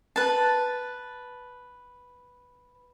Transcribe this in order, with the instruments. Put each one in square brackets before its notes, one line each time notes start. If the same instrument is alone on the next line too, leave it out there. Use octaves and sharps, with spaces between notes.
[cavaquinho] B4 A5